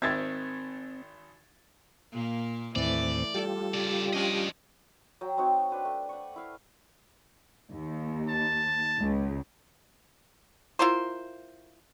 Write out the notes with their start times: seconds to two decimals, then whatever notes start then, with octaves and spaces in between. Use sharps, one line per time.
0.02 G#1 D#3 C4 E5 G#6 A6
2.12 A#2 A#3
2.76 D#2 A2 E3 A3 C4 D5
3.34 G3 F4 G4 A4
3.74 C#3 D5
4.13 F3 C#4 D4 D5 D#5
5.21 F#3 G5 A#5
5.37 C4 D#4 F#4 C#5
5.70 D4 B4 G5
5.85 A3
6.09 F#5 C#6
6.36 E4 F5
7.71 D#2
8.29 A5
8.99 C#2
10.79 E4 F4 A#4 C5